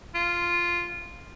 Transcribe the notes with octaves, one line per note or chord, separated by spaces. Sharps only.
F4